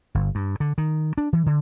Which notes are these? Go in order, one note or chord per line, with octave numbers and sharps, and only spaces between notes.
G1
G2
D3
D#3
D4
E3
D3